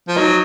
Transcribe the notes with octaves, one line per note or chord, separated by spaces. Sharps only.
F3
F#3 D#4